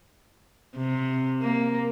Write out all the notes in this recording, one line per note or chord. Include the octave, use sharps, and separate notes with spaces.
C3
A#3